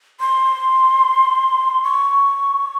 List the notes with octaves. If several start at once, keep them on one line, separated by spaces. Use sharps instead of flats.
C6
C#6